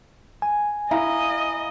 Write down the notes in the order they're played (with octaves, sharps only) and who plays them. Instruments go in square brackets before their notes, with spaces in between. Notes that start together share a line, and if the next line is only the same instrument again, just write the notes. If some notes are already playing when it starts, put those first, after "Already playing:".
[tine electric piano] G#5
[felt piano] E4 F5 A#5 [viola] D#5